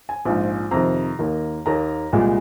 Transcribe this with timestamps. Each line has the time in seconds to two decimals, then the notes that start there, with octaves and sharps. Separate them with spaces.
0.09 G#5
0.25 A#1 G#2 F3
0.71 F2 C3 D#3 A#5
1.19 D#2 D#3 A#3
1.66 D#2 D#3 A#3 A#5
2.12 C2 A#2 G#3